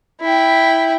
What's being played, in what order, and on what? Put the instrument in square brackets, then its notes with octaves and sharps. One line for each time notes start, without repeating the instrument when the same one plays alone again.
[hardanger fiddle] E4 G5